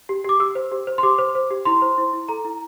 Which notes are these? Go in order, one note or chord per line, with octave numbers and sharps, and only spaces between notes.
G4
G4 D6
G4 E6
C5
G4
C5
C6
G4 D6
C5
C5
G4
E4 C6
C5
E4
E4
A4 A#5
E4